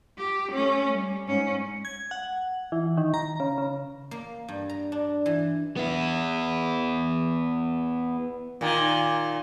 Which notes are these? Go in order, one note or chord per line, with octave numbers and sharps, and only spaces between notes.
G4
A3 C#4
G3
G#2 C#4
G#6
F#5
E3
D#3
A#5
C#3
C#3
A#3
G2
A#5
D4
E3
B3 E4
A#2 D#3